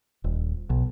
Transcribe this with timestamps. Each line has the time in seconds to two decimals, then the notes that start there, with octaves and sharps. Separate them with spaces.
0.24 D#1
0.70 B1